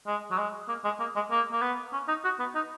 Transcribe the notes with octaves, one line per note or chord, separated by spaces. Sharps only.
G#3
F#3
G#3
A#3
G#3
A#3
G#3
A#3
A#3
B3
C#4
D#4
F#4
B3
D#4